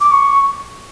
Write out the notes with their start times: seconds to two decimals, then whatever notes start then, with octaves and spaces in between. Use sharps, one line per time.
0.01 D6
0.12 C#6